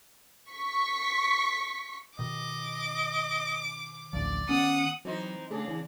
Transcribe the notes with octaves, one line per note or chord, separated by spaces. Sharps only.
C#6 B6
B2 D#3 D#5 D6
A1 D2 F3 D5
D#3 B3 C#4 F#5 D#6
E3 F#3 C4 D#4 C5
C#3 A3 D4 G#4
E3